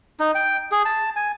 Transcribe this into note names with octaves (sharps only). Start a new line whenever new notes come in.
D#4
G5
G#4
A5
G#5